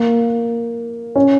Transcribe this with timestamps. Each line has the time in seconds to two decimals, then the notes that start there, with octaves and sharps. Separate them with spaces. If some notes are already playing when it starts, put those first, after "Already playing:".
Already playing: A#3
1.16 C#4